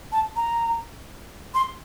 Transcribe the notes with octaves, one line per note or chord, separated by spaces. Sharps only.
A5
A#5
C6